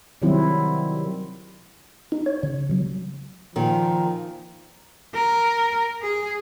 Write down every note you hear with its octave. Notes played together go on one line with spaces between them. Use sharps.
C3 D#3 F#3 G3 C4 E4
D#4
C#5
C#3
F#3
A#2 D#3 F3
A#4
G#4